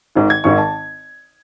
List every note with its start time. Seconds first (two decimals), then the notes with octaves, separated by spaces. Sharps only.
0.15 G#1 G#2 D#3
0.30 G#6
0.44 G#1 G#2 D#3 C#6
0.58 A5